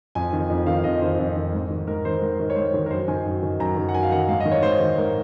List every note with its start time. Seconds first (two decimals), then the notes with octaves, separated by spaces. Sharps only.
0.15 F2 G#5
0.33 D#3
0.50 F2
0.67 D#3 F5
0.78 F5
0.84 F2 D#5
1.01 D#3 C5
1.19 F2
1.36 D#3
1.53 G#2
1.70 D#3
1.87 G#2 A#4
2.05 D#3 C5
2.21 G#2 A#4
2.40 D#3
2.50 C#5
2.56 G#2 C5
2.74 D#3
2.86 A#4
2.91 F#2 C5
3.08 D#3 G#5
3.26 F#2
3.43 D#3
3.60 F#2 A#5
3.77 D#3
3.89 F#5
3.94 F#2 G#5
4.03 F5
4.12 D#3 F#5
4.28 G#2 F5
4.40 D#5
4.45 D#3
4.52 C#5
4.63 G#2 C5
4.80 D#3
4.98 G#2 A#4